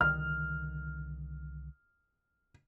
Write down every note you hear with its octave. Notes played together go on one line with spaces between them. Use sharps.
C2 D3 D#3 F6